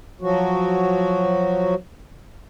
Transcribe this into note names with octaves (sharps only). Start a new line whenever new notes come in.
F3 F#3 F#4